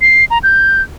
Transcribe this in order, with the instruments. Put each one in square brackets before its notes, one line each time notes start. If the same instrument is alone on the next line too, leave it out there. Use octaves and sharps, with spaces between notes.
[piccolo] C7
A#5
G6